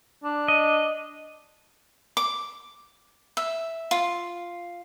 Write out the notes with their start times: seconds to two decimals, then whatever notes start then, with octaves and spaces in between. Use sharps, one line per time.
0.24 D4
0.48 D#5
2.17 D6
3.37 E5
3.91 F4